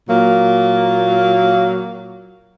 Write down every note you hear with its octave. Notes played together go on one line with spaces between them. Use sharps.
A#2 F#3 A#3